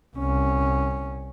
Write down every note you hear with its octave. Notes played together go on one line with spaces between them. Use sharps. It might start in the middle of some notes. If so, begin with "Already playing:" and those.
C2 C#4